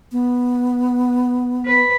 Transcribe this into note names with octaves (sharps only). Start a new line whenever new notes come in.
B3
B4